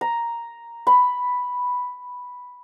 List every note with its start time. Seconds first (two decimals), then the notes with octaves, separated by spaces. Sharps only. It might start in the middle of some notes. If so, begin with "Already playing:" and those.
0.01 A#5
0.87 B5